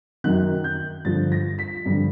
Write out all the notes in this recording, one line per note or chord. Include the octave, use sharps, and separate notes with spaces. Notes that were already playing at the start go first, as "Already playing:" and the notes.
F#2 D#3 F#6
G6
G2 D3 F3 A6
A#6
B6
G2 D3 F3